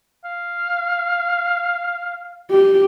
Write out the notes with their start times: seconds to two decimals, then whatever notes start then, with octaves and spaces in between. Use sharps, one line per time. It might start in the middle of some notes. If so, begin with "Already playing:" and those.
0.25 F5
2.51 G4